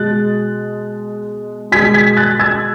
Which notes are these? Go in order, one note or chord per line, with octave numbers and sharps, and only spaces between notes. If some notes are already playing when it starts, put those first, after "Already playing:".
Already playing: B2 G#3 F#6 A6
B2 G#3 G#6 B6
G#6 B6
F#6 A6
E6 G#6